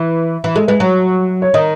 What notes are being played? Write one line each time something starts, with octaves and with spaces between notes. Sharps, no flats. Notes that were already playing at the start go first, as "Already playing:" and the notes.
Already playing: E3
E3
G#3 A4
G#3 B4
F#3 C#5
C#5
D#3 D#5